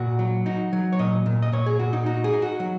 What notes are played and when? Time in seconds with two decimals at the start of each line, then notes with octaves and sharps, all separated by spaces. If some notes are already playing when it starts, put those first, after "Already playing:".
Already playing: A#2 F#4
0.19 F#3
0.46 D#4 F#4
0.73 F#3
0.93 C#5
0.99 A#2 D#5
1.26 A#2
1.42 D#5
1.53 A#2 C#5
1.66 G#4
1.79 A#2 F#4
1.93 D#4
2.06 D#4 F#4
2.24 G#4
2.33 D#4
2.42 F#4
2.60 F#3